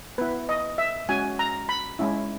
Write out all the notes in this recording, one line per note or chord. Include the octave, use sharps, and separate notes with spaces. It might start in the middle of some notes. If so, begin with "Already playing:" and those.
B3 E4 B4
D#5
E5
G#3 C#4 F#4 G#5
A#5
B5
G#3 C#4 E4